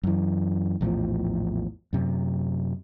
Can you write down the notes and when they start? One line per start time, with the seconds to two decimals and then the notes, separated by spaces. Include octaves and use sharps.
0.03 F#2 E3
0.81 A#1 E2 A2 F3
1.93 F#2 C3